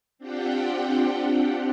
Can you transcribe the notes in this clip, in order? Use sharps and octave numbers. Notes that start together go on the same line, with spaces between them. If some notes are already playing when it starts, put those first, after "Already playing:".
C4 D4 F4 G4 F#5 G5